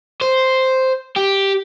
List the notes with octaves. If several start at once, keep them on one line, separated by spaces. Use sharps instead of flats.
C5
G4